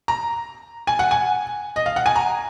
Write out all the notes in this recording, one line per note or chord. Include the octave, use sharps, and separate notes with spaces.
A#5
G#5
F#5
G#5
D#5
F5
F#5
G#5
A#5